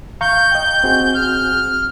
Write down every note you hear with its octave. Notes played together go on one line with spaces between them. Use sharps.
F5 A#5 C#6 G6
D#5 G5
C4 F#4 G#4
F6